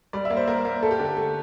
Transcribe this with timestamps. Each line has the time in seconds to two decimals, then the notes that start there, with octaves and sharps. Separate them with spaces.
0.13 G3 D5
0.25 E5
0.30 A#3
0.36 C5
0.47 A#3 A#4
0.65 A#3
0.82 A3 A4
0.91 G4
0.99 D3 A4
1.17 A3